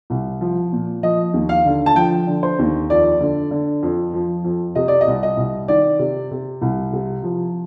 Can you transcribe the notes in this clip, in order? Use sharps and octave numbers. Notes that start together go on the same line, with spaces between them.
C2
F3
A#2
F3 D#5
D#2
F5
D3
A5
F3 G5
D3
C5
D#2
F2 D5
D3
D3
F2
F3
F2
C3 D#5
D5
D#5
C2
D#5
C2
D#3 D5
C3
C3
C2
C3
F3